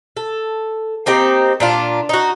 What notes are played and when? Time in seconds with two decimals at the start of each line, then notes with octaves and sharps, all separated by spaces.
0.17 A4
1.06 A#3 C4 D#4 G4
1.60 A#2 D4 F4
2.09 D#4 F#4